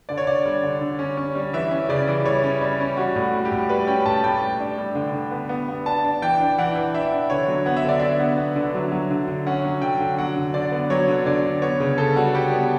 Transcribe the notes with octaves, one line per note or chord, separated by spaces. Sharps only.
D3 D5
C#5
D3 D5
G3
D3
D3
C#4
C#4
G3
E3 E5
C#4
C#3 D5
E3
G3 C#5
C#4
G3
C#4
G3 F#4
A2
F#4
G3
G4
A2
G3 B4
C#4 G5
A2 A5
A2 G5
G3
D4
G3
D3
D3
B3
B3
B3
D4 A5
D4
E3 G5
D4
E3 F#5
E3
D4 E5
D4
D3 C#5
F#3
B3 F#5
E5
D3 D5
D4 E5
B3
B3
D3
F#3
F#3
D3
D3
C#4 F#5
F#3
D3 G5
D3
F#3 F#5
D3
D3 D5
B3
F#3 C#5
D3
D3 D5
D3
B3 C#5
C#3
C#3 A4
G3 F#4
G3 G4
B3